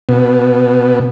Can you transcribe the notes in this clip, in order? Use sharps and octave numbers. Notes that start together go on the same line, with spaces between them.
B2